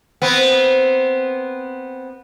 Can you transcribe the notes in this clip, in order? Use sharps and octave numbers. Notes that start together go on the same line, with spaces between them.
B3 C4